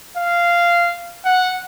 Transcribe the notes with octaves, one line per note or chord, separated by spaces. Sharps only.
F5
F#5